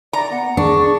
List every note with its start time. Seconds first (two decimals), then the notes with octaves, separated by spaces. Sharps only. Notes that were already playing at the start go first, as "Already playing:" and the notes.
0.13 D5 A#5
0.31 B3 F#5
0.57 D4 G#4 C#6